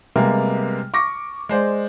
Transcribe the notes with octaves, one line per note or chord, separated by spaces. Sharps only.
C3 G3 G#3 A#3 B3
C#6 D6 A#6
G#3 C5 D5